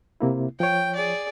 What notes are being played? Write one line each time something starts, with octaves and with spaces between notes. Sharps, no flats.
C3 A#3 E4
F3 C#5 G5
G#4 D5